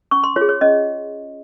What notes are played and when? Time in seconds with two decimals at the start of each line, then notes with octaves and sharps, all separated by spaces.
0.11 C#4 C#6
0.24 C6
0.36 F4 C#5
0.41 G#4
0.49 C#5
0.61 C#4 D#5